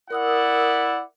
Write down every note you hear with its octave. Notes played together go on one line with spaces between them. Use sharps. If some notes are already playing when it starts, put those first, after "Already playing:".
E4 A#4 D5 F#5 D#6 E6